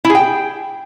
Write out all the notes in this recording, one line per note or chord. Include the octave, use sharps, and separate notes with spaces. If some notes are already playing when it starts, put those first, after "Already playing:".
E4
G#4
G5